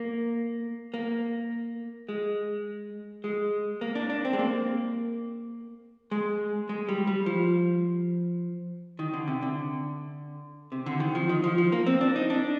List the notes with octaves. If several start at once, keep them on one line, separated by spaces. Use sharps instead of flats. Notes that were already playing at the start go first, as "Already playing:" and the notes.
Already playing: A#3
A#3
G#3
G#3
A#3
D4
D4
C4
G#3
A#3
G#3
G#3
G3
G3
F3
D#3
D3
C3
D3
C3
D3
D#3
F3
D#3
F3
F3
A#3
C4
D4
D#4
D4